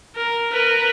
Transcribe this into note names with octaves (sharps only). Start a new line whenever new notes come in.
A#4
A#4 B4